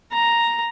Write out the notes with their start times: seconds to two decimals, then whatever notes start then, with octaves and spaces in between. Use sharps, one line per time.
0.12 A#5